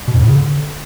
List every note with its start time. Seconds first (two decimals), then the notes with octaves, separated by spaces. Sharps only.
0.08 B2
0.14 F2
0.21 A2
0.28 C#3
0.34 D3